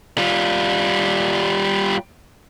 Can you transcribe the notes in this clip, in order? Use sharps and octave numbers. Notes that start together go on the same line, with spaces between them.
G3 F4